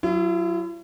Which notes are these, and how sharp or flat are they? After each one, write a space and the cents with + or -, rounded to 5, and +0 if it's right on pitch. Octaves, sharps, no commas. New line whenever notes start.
F#3 +0 E4 +45